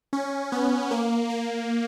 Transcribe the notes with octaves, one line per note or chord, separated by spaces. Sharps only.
C#4
B3
A#3
A#3